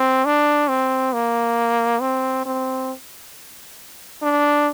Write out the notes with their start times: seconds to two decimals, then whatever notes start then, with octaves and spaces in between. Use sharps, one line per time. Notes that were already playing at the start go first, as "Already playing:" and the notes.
Already playing: C4
0.25 D4
0.68 C4
1.13 A#3
2.01 C4
2.45 C4
4.22 D4